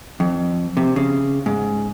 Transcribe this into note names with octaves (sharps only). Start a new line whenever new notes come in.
F2
C3
C#3
G#2